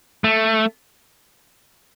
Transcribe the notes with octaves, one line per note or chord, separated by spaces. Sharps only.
A3